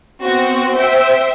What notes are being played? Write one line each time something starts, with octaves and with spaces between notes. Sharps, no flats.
B3 C4 F#4
C5 E5 G5